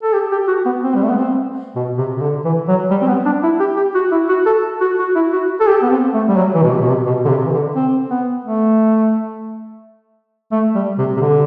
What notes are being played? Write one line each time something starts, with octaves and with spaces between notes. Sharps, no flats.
A4
G4
G4
F#4
B3
C4
G3
A3
B3
C4
B2
C3
C3
D3
E3
F#3
G3
C4
B3
D4
E4
G4
G4
F#4
E4
F#4
A4
F#4
F#4
E4
F#4
A4
G4
B3
C4
A3
G3
F#3
E3
B2
C3
B2
C3
B2
D3
C3
E3
D3
C4
B3
A3
A3
G3
C3
C3
D3